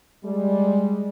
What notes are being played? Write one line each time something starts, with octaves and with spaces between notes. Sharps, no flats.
G3 G#3